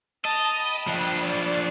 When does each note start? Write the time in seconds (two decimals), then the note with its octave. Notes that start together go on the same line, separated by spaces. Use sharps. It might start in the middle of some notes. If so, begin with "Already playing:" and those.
0.25 D#5 A5 A#5
0.58 G5 B5
0.88 F3 D4
1.21 D5